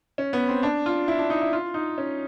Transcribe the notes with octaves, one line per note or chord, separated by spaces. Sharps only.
C#4
B3
C4
D4
F4
E4
D4
D#4
E4
F4
D#4
C#4